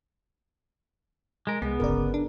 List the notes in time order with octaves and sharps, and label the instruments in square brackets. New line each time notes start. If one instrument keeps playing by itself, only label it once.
[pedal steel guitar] G#3 A#4
[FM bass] C2 [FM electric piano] G#3 [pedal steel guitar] B3 [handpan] G#4
[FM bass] D1 [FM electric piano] G1 C#3 D5 [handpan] A#4
[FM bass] D4